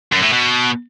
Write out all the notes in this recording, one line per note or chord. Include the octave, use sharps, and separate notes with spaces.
F#2
A2
B2